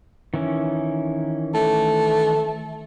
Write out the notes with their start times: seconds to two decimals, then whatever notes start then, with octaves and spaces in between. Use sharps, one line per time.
0.34 D#3 E3 C#4
1.54 A3